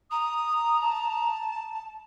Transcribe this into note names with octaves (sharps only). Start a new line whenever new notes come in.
A#5 D#6
A5